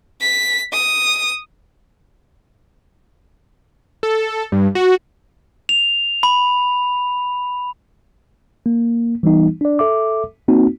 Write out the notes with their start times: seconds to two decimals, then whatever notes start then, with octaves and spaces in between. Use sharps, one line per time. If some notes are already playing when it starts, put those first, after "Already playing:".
0.21 B6
0.73 D#6
4.03 A4
4.52 G2
4.75 F#4
5.69 F7
6.23 B5
8.66 A#3
9.23 E3 G3 B3 D#4
9.61 D4 D5
9.79 A4 E5 D6
10.48 A#3 C4 D#4 F#4